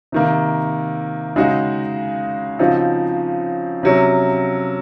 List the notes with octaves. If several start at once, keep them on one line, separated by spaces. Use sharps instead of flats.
C3 D#3 A#3
C#3 G#3 D#4 F#4
C#3 F3 C4 D#4 F#4
C3 F#3 C#4